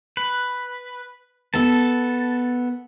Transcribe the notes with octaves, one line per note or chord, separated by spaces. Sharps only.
B4
B3 A4 A5